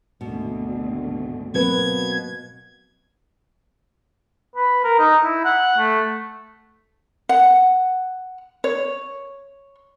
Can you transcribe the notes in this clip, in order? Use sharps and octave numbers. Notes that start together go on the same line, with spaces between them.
G#1 D2 B2
B2 F#3 A#3 C4 B4 G#6
B4
A#4
D#4
E4
F#5
A3
F#5
C#5